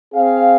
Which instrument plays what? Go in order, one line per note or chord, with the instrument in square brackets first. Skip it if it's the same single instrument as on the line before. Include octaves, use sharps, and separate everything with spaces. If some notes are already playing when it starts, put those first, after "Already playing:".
[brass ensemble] C4 G#4 F5